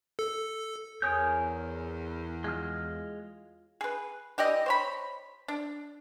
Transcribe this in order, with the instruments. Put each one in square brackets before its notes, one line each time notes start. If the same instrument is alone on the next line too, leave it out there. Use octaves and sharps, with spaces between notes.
[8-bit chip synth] A4
[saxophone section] E2 [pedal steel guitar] A#4 D#6 G6 [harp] C#5 G#5
[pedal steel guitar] G#3 F6 [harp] F4
[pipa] G#4 B4
E3 G4 D5 D#5
C5 C#5 B5
D4